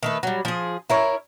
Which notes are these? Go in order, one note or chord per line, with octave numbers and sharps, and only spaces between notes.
D#3 A3 B4
F#3 G3
F3 G#4
E4 A#4 C#5